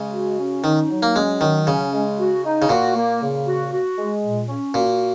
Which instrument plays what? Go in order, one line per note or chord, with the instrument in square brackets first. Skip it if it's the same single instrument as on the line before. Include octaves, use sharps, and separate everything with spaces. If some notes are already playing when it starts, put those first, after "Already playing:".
Already playing: [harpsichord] C#3 [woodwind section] G#3
[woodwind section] F#4
C#4
[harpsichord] D#3 [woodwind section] D#4
[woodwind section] F#3
[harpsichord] A#3
[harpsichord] G#3 [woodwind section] C#4
[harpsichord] D#3 [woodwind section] F#3
[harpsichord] C#3 [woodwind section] C#4
[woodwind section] G#3
F#4
D#4
[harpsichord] C#3
[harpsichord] A#2 [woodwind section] F#4
[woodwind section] A#3
C#3
F#4
F#4
G#3
A#2
C#4
[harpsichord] A#2 [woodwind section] F#4